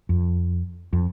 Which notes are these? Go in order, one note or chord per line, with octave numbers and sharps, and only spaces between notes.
F2
F2